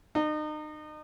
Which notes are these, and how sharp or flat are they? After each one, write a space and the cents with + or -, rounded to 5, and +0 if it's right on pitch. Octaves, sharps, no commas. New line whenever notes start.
D#4 -35